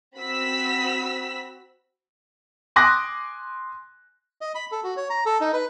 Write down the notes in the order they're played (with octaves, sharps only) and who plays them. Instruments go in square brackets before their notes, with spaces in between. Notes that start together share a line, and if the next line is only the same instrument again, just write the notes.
[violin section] C4 F#4 B5 E6 B6
[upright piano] G#5 C6 D6 D#6 F#6 A#6
[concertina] D#5
B5
A4
F#4
C#5
A#5
A4
D#4
B4